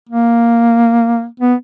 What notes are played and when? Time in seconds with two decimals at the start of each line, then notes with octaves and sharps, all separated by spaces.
0.09 A#3
1.40 B3